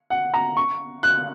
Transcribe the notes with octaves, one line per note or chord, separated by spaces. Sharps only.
F#5
A#5
C#6
F#6